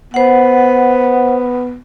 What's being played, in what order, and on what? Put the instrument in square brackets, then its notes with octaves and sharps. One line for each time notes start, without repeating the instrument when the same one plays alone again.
[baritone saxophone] B3 [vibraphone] C5 F#5